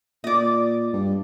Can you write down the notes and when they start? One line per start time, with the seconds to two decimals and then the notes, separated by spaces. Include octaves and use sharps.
0.24 A#2 D5 D#5
0.93 G2